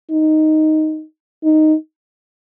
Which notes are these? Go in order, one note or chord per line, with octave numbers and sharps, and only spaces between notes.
D#4
D#4